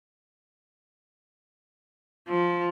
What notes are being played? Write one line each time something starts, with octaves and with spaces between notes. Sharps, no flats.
F3